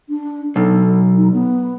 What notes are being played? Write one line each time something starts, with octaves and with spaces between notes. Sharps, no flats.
D4
B1 A4
D#4
B3